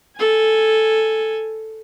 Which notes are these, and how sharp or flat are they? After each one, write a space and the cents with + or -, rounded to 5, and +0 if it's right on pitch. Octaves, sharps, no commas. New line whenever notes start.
A4 +0 G#5 +0